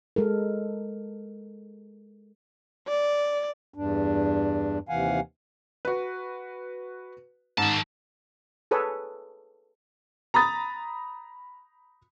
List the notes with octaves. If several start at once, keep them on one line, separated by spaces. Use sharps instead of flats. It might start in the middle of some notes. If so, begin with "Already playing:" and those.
G#3 A4 A#4
D5
E2 G2 D4
D#2 C3 E3 F5 F#5 G#5
F#4 B4
G#2 D#3 A5
G#4 A4 B4 C#5
A#5 B5 D#6 A6